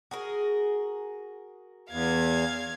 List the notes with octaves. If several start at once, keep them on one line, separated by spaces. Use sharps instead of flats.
F#4 G#4 A#4
E2 F5 G#6